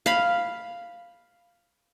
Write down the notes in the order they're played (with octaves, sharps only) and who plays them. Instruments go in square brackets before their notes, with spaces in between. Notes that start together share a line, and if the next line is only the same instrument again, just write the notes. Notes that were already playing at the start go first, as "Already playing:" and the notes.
[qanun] F5 B5